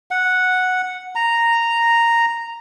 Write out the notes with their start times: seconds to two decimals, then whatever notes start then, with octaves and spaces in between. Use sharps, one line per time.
0.11 F#5
1.15 A#5